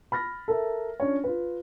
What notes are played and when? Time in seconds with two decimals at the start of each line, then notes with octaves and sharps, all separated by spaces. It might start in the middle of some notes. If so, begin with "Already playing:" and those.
0.12 B5 F6 A6 A#6
0.48 A4 A#4 E5
1.00 C#4 D4 C#5
1.24 F4 B4